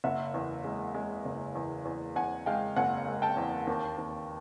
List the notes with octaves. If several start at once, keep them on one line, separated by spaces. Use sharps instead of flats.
F#1 E5 F#5
E2
G#3
G#3
F#1
E2
E2
E2 F#5 G#5
G#3 F5 G5
F#1 F#5 G#5
G#3
G5 A5
E2
D#2
D#2